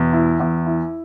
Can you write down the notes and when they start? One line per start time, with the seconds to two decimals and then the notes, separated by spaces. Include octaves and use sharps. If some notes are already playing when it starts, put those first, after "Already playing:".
Already playing: E2 B2
0.13 E4
0.40 E2
0.66 E4